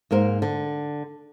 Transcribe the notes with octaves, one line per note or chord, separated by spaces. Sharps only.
G#2 A#3 A#4 C5
D3